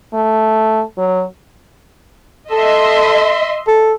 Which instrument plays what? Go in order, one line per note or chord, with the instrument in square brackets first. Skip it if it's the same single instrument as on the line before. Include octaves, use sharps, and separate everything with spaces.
[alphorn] A3
F#3
[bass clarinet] A4 [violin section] D#5 E5 C6
[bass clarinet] A4